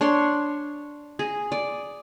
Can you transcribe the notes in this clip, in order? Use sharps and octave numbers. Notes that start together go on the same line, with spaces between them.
D4 C#5 C6
G#4
D5